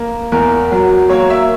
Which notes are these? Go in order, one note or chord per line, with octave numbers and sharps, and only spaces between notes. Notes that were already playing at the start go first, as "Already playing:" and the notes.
Already playing: A#3
E2 A#4
F#3
A#3 C#5
E5